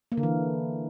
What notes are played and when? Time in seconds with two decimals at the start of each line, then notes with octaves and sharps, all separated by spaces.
0.12 A#3
0.17 D3
0.23 E3